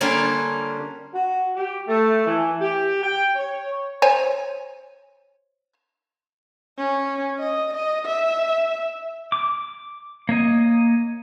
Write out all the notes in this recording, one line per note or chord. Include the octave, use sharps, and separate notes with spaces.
D3 G3 A#3 C#4 D4 F4
F#4
G4
A3
E3
G4
G5
C#5
C5 C#5 G#5
C#4
D#5
D#5
E5
D6
A#3 C#5 D#5